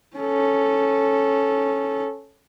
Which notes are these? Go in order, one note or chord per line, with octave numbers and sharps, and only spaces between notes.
C#4 A4